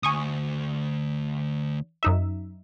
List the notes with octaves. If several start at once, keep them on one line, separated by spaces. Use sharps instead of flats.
D2 G#5 C#6 D#6
F#2 D#4 E5